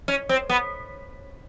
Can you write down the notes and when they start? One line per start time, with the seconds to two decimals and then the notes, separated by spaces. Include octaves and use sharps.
0.08 C#4
0.29 C4
0.50 B3